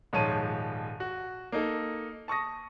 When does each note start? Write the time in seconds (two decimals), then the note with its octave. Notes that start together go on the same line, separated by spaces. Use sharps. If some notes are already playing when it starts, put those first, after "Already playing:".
0.13 D#1 G#2 F3 C#5 A5 D#7
1.00 F#4
1.52 A#3 D#4 A4
2.28 A5 C#6 D#6 A#6